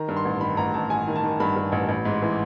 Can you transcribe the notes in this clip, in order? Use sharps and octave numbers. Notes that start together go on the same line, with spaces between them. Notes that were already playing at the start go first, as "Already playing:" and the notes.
Already playing: D#3 A#5
G2
C6
A1
D#3 B5
A1 A#5
A1 A5
A1 G#5
D#3
A5
D#3
G2 B5
G2
A1
A1
G#2
E3